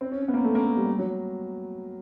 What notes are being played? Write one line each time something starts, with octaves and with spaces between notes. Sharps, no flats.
C4
C#4
C#4
B3
A#3
A3
A#3
A3
G3
G3
F#3